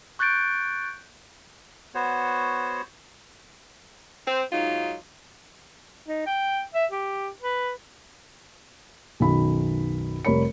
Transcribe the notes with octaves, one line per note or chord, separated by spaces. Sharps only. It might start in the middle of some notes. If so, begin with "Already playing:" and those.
C#6 F#6 G6 A6 C#7 D7
B3 F#4 C5 C#5
C4
G#2 F#3 D#4 F4
D#4
G5
E5
G4
B4
B1 F#2 D#3 B5
F1 G3 A#4 C#5 B5 C#7